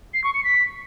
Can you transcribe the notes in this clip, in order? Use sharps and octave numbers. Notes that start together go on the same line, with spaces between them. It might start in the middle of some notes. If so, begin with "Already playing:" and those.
C7
C#6
C#7
B6